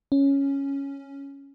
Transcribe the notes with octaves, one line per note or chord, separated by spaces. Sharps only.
C#4